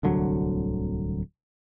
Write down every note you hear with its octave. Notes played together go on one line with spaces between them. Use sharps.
D1 C2 D3 F#3